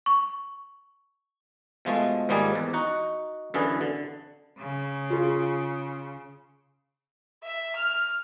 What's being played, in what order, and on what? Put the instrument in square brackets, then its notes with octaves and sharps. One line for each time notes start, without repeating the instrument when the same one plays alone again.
[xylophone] C#6
[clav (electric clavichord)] B2 F3 G#3 A3
G#2 D#3 F3 G3 A#3 G#4
E2
D#4 F#4 F#5
F#2 D3 E3 G#4 B4
D3
[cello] C#3
[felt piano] F4 G#4
[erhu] E5
F6